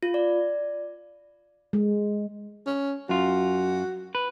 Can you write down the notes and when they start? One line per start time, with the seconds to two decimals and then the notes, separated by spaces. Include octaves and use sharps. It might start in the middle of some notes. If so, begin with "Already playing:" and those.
0.03 F4
0.14 D5
1.73 G#3
2.66 C#4
3.09 F#2 F4 F#4
4.15 B4